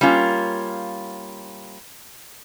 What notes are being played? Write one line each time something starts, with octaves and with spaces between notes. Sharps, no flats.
G3 A#3 C#4 F4